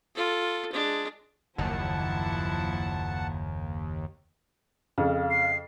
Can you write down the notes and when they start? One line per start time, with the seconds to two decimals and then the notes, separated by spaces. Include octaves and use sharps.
0.15 F4 A4
0.73 G#3 D4
1.58 F#1 D#2 F3 E4 F#5 A5
4.98 F2 C#3 F5
5.31 C7